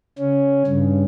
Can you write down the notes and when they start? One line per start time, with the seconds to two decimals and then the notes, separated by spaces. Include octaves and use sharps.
0.18 C#3 C#4
0.67 G2 C#3